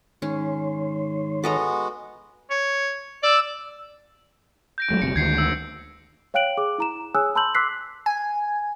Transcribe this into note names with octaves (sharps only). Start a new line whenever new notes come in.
G#2 D#3 C#4 C#5 C6
G#3 B3 F#4 A4 D#5 A#5
C#5
D5 E6
G6 A#6 D7
F#3 G#3 A3
G1 C3 C#7
D2 D#3 G#3 G#6 C7 C#7
E6
C#5 F5 G5 F#6 D7 F#7
G#4 D6
E4 A#5 E7
G#4 C#5 G#5 D#6 E6 F#6
A5 B5 C6 E6 G6 F#7
C6 D6 E6 F#6 B6 C7
G#5